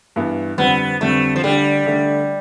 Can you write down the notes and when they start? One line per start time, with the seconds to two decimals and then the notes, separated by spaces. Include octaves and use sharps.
0.16 G2 E3 B3
0.58 F2 D3 G3 B3 C4
1.00 F2 D3 G3 A3 C4
1.36 F3
1.44 D3 G3 A3 D4
1.86 D3 A3 D4